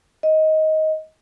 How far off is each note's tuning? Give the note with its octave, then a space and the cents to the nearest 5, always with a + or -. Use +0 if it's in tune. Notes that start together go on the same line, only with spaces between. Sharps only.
D#5 +15